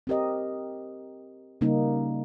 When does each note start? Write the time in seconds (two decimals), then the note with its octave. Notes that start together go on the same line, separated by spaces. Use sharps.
0.07 C4 G4 A#4 D#5
1.61 C#3 G3 A#3 D#4